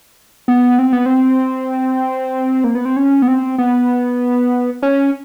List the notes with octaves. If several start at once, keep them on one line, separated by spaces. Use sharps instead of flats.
B3
C4
B3
C4
A#3
B3
C4
C#4
B3
C4
B3
C#4